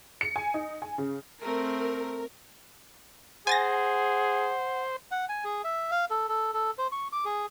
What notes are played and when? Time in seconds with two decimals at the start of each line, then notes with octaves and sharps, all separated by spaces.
0.21 C#7
0.36 G#5
0.54 D#4
0.82 G#5
0.98 C#3
1.41 A3 C4 A#4
3.47 G#4 C5 F#5 G#5 A6 A#6
5.11 F#5
5.29 G#5
5.44 G#4
5.64 E5
5.91 F5
6.10 A4
6.29 A4
6.54 A4
6.78 C5
6.92 C#6
7.12 D6
7.25 G#4